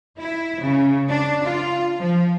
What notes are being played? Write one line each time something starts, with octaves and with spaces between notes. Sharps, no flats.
E4
C#3
D4
F4
F3